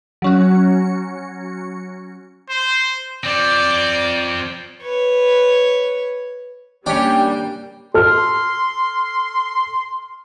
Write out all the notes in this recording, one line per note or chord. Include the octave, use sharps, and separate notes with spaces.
F#3 C#4 F#4
C5
F3 C4 D5
B4 C#5
G3 A#3 C#4 D4 G4 C#5 G5
A4 C6 F6